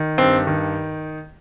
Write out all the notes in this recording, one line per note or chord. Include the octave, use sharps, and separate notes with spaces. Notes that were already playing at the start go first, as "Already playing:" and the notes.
Already playing: D#3
G2 C4
D#3